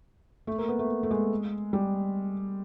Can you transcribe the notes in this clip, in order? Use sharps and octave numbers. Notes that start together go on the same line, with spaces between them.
A3
A#3
B3
A3
A3
G#3
G3